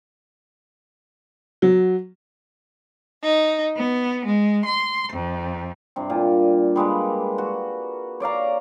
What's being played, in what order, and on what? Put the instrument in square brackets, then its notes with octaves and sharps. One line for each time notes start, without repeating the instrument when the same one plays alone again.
[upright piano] F#3
[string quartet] D#4
B3
G#3
C6
F2
[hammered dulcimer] G2 C3
A#2
G3 G#3 A#3 B4
F#4
C#5 D5 F5 A#5